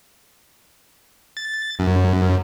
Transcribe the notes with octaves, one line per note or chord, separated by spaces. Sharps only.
A6
F#2